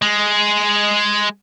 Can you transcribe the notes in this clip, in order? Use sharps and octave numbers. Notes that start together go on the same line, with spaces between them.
G#3